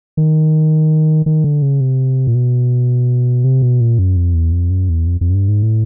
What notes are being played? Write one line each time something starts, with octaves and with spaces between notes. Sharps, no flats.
D#3
D#3
D3
C#3
C3
A#2
B2
C3
B2
A#2
F#2
F2
E2
F2
F#2
E2
F2
F2
F#2
G2
G#2
A2